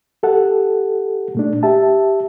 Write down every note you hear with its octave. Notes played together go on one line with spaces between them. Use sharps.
G4 A4 F#5
A#2 A3 D4
G4 E5 A5